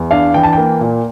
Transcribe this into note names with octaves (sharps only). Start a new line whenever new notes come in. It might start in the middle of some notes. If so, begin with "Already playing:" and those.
Already playing: E2
D4 F5
E3 G5
A5
A#3 G5
A#2